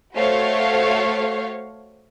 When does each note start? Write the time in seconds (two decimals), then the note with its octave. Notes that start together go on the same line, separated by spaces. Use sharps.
0.16 A3 F#4 C5 C#5 F5